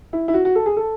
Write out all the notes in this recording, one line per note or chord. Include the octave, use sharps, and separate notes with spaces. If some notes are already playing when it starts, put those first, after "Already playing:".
E4
E4
F#4
F#4
A4
G#4
A4